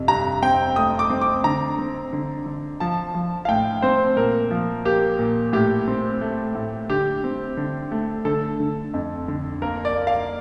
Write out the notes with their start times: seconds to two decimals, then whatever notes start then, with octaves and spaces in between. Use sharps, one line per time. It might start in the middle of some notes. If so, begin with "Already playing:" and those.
Already playing: F2 C3
0.08 G2 A#5
0.42 C4 G5
0.76 A3 D#6
0.99 D6
1.10 C4
1.21 D6
1.44 D3 A#5
1.79 C4
2.13 D3
2.46 D3
2.80 F3 A5
3.15 F3
3.45 F5
3.49 A2 G5
3.82 C4 C5
4.17 A#2 A#4
4.51 F3
4.85 A#3 G4
5.19 A#2
5.53 A2 G4
5.88 C4
6.21 A3
6.55 A2
6.89 D3 G4
7.24 C4
7.57 D3
7.92 A3
8.25 D3 A4
8.60 D3
8.94 F2
9.28 D3
9.62 A#3 A#4
9.85 D5
9.96 A#3
10.07 F5